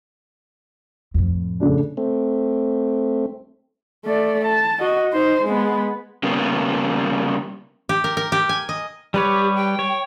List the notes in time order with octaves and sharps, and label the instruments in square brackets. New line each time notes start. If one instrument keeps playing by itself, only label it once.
[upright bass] F2 A2
[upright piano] C#3 A3 D4
[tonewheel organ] A3 C4
[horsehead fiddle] A3 D5
A5
F#4 D#5
D#4 C5
G#3 B3
[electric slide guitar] C#3 G3 A#3 B3
[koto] G4
A#4
A#4
G4
G#5
D#5
[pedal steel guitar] G3 B4 C#5 [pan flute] G4
[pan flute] G5
[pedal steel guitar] C#5